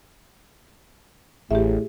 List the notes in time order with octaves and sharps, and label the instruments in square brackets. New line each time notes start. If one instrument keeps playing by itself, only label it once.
[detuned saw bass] A1 [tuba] A2 [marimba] G4 E5 [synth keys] G#4